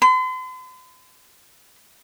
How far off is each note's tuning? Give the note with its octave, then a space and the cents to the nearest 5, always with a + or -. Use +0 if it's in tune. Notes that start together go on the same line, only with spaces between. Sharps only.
C6 -45